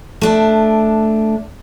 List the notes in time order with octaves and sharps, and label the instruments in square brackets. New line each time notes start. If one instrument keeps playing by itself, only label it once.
[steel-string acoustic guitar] A3 D4